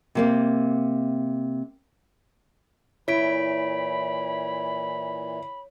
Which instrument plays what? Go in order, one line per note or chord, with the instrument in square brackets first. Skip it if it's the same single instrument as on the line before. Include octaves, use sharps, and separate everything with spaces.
[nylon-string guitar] C3 A#3 C4
[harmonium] A#2 E3 [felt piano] E4 [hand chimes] C#5 B6 D7 [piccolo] B5